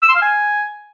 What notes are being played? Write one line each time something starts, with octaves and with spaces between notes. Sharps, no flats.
E6
C6
F5
G#5